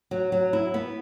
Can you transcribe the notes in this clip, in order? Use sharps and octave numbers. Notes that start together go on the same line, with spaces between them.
F#3
F#3
E4
B3